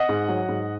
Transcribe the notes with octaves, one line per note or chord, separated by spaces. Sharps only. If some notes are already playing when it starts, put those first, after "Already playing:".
Already playing: D#5 F#5
G#2
F#3
G#2